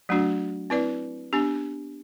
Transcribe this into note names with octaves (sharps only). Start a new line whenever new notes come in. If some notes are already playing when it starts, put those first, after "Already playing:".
F#3 A3 D4 F#4
C4 E4 B4 D5
B3 D4 G4